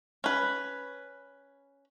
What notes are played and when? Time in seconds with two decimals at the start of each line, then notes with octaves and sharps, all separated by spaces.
0.24 C#4 B4